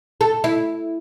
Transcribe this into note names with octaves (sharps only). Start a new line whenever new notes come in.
A4
E4